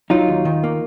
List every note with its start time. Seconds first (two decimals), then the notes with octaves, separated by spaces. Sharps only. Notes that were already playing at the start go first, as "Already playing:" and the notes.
0.10 F#3 D#4 F4
0.28 D#2
0.45 D#3
0.64 A#3